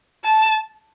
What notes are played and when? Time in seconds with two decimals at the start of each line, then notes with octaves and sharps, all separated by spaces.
0.25 A5